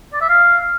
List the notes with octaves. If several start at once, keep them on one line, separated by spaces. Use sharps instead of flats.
D5
E5
F5